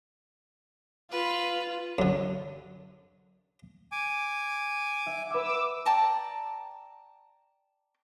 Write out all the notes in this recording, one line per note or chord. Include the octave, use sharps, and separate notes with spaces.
F4 B4
F#2 D3
G#5 D6
E5 F#5
B4 F#5 D6 E6
D5 G5 A5 A#5